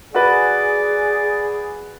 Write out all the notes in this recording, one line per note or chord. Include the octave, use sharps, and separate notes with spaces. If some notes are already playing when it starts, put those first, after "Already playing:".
F#4 G#4 B4 D5